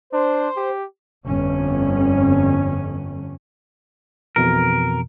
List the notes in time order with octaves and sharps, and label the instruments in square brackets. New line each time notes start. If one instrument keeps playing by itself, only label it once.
[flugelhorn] D4 [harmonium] C5
[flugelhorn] G4
[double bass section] G1 F2 D3 C#4
[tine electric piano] F2 B2 E3 [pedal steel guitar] A#4